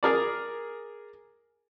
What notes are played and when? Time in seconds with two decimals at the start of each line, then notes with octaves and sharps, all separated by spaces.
0.03 G#4 A#4 D5